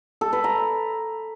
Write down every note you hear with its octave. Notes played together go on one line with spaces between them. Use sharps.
A4
B4
A#5